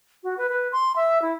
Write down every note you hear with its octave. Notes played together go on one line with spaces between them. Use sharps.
F#4
B4
B4
C6
E5
E4